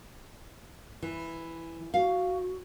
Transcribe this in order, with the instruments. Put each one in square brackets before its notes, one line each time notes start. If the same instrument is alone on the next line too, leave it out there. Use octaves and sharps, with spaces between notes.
[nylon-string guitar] E3
[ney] F#4 [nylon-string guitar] F5